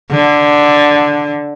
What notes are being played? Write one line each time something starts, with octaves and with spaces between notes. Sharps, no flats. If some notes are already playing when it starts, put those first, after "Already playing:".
D3